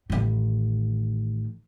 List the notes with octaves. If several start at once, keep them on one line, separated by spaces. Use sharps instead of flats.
A1 D#3